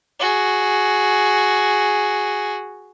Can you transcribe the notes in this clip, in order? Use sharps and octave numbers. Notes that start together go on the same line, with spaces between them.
F#4 G#4